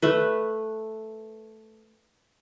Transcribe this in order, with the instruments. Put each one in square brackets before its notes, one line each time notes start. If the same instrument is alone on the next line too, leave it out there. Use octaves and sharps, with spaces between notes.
[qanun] A3 B4